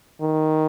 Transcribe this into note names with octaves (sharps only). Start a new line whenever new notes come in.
D#3